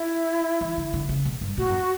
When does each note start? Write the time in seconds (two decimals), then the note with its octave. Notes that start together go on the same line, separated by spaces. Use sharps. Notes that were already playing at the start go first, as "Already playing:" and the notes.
Already playing: E4
0.61 E3
0.77 D3
0.93 D3
1.09 C#3
1.25 B2
1.41 G2
1.57 A2 F#4
1.69 F#2